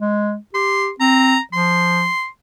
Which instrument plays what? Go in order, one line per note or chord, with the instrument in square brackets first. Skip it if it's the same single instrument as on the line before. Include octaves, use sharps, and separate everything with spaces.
[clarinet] G#3
[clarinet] G4 [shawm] C6
[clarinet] C4 [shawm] A#5
[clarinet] F3 [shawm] C6